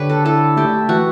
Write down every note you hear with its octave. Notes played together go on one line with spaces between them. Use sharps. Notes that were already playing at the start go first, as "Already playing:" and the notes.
Already playing: D3 G4 B4 C#5
A4
E4 A4
A3 G4
E3 F#4